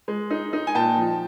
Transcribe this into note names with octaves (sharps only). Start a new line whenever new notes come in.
G#3
D#4
D#4
G#5
A#2 G5 A5
F3